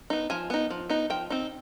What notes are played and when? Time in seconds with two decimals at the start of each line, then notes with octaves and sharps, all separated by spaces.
0.10 B3 D#4
0.30 F3 G#5
0.50 B3 D#4
0.70 F3
0.89 B3 D#4
1.10 F3 G5
1.30 C4 D#4